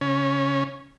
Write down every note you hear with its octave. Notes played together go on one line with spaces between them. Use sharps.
C#3 C#4